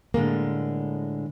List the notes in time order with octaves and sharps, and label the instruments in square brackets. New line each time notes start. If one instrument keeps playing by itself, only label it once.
[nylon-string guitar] A2 D3 G#3 A#3